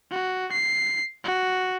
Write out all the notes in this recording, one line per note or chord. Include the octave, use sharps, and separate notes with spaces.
F#4
C7
F#4